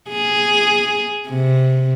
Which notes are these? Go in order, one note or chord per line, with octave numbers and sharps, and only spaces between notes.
G#4
C3